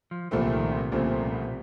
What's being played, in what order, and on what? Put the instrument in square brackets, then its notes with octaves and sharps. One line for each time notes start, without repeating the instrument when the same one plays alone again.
[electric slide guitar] F3
[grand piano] C2 A#2 F3 A3 C4 [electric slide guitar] E3
[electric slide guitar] D#3
C3
[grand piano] C2 A#2 F3 A3 C4 [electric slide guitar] C#3
[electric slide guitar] C3
B2